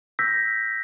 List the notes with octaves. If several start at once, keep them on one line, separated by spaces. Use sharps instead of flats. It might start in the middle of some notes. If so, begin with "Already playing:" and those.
E6 G6 A#6 B6